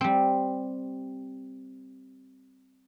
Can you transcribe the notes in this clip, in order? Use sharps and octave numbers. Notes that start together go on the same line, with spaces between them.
G3 C4